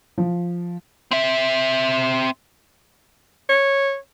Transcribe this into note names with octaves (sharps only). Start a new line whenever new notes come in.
F3
C4 E5
C#5